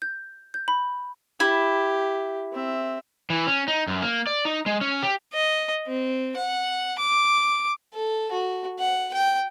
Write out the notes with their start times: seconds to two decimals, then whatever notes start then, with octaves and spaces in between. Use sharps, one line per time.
0.02 G6
0.54 G6
0.68 B5
1.40 E4 G4
2.52 C4 E5
3.30 E3
3.47 C#4
3.68 D#4
3.87 F#2
4.02 A#3
4.27 D5
4.45 D#4
4.66 G#3
4.81 C#4
5.03 G4
5.33 D#5
5.87 C4
6.37 F#5
6.99 D6
7.93 A4
8.31 F#4
8.79 F#5
9.13 G5